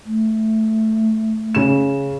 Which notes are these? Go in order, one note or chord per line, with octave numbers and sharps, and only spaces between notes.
A3
C#3 E7